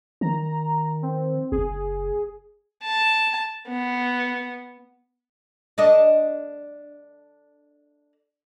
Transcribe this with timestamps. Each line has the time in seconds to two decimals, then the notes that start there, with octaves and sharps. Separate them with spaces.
0.21 D#3 A#5
1.02 C4
1.52 F#1 G#4
2.83 A5
3.68 B3
5.78 D4 A4 D#5